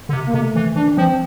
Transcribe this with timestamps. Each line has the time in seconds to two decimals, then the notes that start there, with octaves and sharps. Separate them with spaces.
0.09 D3
0.13 C3
0.27 A#3
0.34 C3 A3
0.56 E3
0.75 E3 D4
0.97 F3 C4